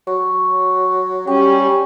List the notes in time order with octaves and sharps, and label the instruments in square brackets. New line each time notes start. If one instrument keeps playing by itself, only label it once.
[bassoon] F#3 [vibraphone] C#6
[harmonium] G3 C#4 [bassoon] G4 [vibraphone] C#6